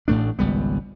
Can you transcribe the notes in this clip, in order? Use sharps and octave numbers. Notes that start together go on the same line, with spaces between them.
A1 A2 A3 D4
G#1 C#2 G3 B3